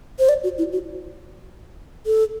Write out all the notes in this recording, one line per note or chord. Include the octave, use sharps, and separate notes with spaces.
C5
D5
F#4
E4
F#4
A4